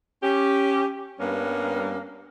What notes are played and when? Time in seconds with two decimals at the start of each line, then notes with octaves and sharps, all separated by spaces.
0.23 C#4 G4
1.20 G2 G3 A#3 B3 C#4